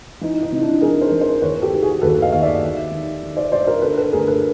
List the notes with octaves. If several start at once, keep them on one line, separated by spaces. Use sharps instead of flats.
E3 D#4
D#4
C3
D4 E4
E3 G#4 A#4
A#4 C5
E3
A#4 C5
D#2 B4 C#5
G4 A4
D#3
F#4 G#4
D#2 A4 B4
D#5 F5
D#2 F5
D5 E5
D#3
D#3
D#3
C5 D5
G2 C5 D5
A#4 C5
D3 A4 B4
A4 B4
D2 G#4 A#4
A4 B4